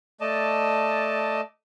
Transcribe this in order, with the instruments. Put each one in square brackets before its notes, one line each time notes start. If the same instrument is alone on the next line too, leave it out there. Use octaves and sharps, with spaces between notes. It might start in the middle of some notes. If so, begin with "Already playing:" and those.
[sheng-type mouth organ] A3 D5 D#5 A5